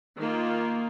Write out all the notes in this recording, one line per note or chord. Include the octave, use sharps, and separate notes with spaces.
D#3 A#3 F4